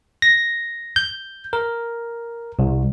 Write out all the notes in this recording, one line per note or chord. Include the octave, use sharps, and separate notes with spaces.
A#6
G6
A#4
C2